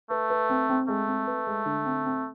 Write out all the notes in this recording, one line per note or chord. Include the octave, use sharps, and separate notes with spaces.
A3 B4
B4
C4
C4
G#3 A3
C4
B4
G#3
D3
C4
C4